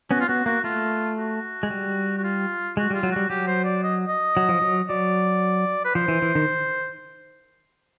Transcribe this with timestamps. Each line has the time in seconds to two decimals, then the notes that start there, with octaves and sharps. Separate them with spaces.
0.11 B3 C#4 F#4
0.20 F4
0.28 B3 F#4
0.46 A#3 F#4
0.64 A3 F4
1.17 F#4
1.63 G#3
1.70 G3
2.18 F#4
2.23 F4
2.77 G#3 F#4
2.90 G3 F4
3.03 F#3
3.12 G3 F#4
3.30 F#3 G4
3.47 C5
3.65 D5
3.83 D#5
4.08 D#5
4.37 F#3
4.49 F3
4.61 F#3
4.89 F#3 D5
5.85 B4
5.95 F3 C5
6.08 E3
6.22 E3
6.35 D#3